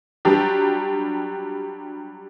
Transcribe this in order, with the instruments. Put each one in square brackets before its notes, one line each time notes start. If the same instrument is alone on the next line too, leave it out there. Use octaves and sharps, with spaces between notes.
[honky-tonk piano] F#3 G3 D4 G4